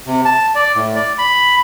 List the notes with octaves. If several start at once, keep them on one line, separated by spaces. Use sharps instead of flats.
C3
A5
D5
A2
D5
B5